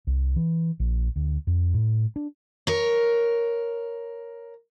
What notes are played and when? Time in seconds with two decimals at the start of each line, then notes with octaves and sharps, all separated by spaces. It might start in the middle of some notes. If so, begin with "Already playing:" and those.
0.07 C2
0.36 E3
0.80 A#1
1.16 D2
1.47 F2
1.74 A2
2.16 D4
2.67 A#4 C#5